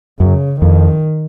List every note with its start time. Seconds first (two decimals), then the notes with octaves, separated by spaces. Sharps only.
0.20 F#2 C#3
0.61 F2 D#3